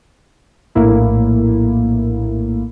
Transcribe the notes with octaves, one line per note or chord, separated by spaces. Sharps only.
A#1 A2 A#3 E4